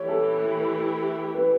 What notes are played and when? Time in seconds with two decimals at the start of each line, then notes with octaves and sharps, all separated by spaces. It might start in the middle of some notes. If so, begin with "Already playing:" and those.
Already playing: E3 A3 E4 G4 C#5
0.08 A4
1.34 B4